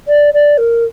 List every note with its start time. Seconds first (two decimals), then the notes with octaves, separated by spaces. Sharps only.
0.08 D5
0.34 D5
0.58 A#4